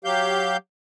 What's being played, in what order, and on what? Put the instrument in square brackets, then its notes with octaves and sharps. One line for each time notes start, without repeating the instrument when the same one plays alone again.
[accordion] F#3 G4 F5 G6